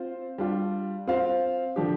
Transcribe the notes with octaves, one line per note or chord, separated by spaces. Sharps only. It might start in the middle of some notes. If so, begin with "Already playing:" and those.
Already playing: C4 F4 C5
G3 D4 F4
C4 F4 C5 F5
D3 F3 D4 G4